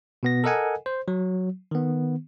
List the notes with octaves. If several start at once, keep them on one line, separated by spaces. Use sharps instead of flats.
B2 B3 A#6
A4 A#4 D#5 F#5 G#5
C5
F#3
D#3 B3